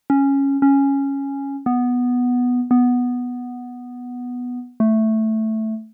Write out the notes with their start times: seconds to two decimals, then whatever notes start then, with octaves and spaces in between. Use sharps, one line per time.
0.10 C#4
0.62 C#4
1.66 B3
2.71 B3
4.80 A3